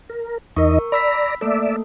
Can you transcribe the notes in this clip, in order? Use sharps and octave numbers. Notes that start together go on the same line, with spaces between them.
A#4
E2 D#4 A#4 D#5 C#6
D5 A#5 B5 E6 B6
A3 A#3 A4 D5 E5